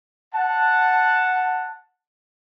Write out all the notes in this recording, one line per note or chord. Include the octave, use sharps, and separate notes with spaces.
F#5 A5